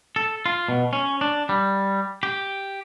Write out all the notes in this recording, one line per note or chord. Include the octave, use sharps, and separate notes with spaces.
A4
F4
B2
C#4
D4
G3
G4